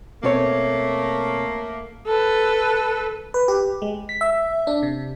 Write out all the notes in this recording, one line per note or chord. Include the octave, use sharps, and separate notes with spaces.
B2 A3 A#3 C4 C#5
A4 B4
B4
G4
G#3
B6
E5
D4
C3